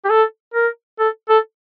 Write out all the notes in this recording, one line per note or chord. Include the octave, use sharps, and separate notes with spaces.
G4
A4
A#4
A4
A4